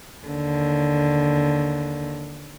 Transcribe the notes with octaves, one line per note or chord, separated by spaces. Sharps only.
D#2 D3